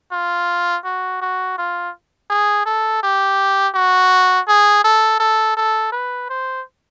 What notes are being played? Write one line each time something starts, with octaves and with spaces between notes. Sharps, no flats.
F4
F#4
F#4
F4
G#4
A4
G4
F#4
G#4
A4
A4
A4
B4
C5